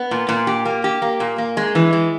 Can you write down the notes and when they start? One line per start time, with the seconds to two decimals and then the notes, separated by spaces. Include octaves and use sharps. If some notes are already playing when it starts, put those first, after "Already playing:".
Already playing: B3
0.11 A#2
0.29 A#2
0.47 G4
0.65 A#3
0.84 G4
1.02 A#3
1.20 A#2
1.38 A#3
1.57 G#3
1.75 E3
1.93 G#3